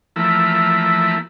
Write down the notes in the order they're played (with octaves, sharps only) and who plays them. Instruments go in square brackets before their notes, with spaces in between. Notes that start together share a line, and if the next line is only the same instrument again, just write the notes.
[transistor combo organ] E3 F3 A3 A#3 E4